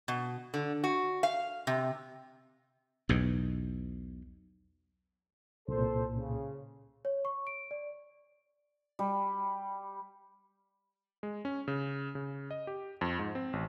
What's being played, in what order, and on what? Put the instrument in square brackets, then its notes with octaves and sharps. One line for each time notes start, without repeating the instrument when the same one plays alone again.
[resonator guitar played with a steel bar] B2
D3
F#4
F5
C3
[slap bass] B1 E2 B2
[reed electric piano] C2 A#2 [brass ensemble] A4 C5
[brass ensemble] C#3
[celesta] C#5
C#6
D7
D5
[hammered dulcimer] G3
[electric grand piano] G#3
C#4
C#3
C#3
D#5
G4
F2
G#2
C4
A1